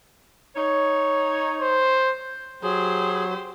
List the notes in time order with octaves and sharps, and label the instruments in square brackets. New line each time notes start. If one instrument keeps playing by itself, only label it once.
[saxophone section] D#4 C#5
[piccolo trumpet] C5
[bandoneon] F#3 [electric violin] G4 C5 [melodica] G#4